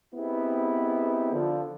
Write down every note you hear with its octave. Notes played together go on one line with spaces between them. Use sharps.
B3 C4 D#4 E4 G4 G#4
D3 F3